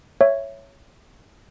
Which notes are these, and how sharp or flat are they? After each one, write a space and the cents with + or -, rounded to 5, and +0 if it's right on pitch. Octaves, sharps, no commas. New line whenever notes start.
C#5 +0 E5 +10